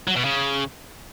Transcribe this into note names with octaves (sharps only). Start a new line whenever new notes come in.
F#3
B2
C#3